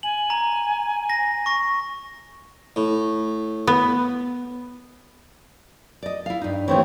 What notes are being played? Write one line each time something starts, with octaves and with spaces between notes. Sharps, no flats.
G#5 F#7
A#5
A#6
C#6 A#6
A2
B3
D5 D#5
E4 F5
G2 D#4
D#2 E3 A3 C4 D#4 C#5